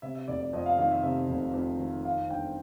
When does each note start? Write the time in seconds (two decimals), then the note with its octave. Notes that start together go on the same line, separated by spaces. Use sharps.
0.02 C3 E5
0.15 E5
0.28 F1 D5
0.40 D5
0.53 F2 D#5
0.66 F5
0.78 D#3 F5
0.91 E5
1.03 C3 E5
1.29 F1
1.54 F2
1.79 D#3
2.05 D#3 F5
2.30 G1 G5